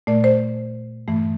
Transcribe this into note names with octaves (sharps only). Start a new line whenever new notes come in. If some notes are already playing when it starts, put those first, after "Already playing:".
A#2 A3 D5
C5
G2 E3 A3